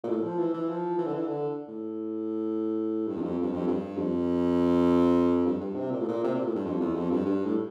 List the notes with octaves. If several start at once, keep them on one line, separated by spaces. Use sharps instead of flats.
A#2
A2
F3
E3
E3
F3
E3
D3
E3
D3
A2
G2
E2
F2
G2
F2
G2
F2
G2
G2
C3
A#2
A2
A#2
C3
A#2
A2
G2
F2
E2
F2
G2
G2
A2